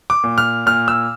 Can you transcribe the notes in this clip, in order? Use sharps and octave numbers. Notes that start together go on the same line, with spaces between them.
D6
A#2
F6
A#2 F6
E6